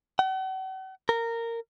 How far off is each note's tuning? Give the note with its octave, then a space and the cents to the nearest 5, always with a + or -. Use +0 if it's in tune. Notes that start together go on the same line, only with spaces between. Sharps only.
F#5 +45
A#4 -15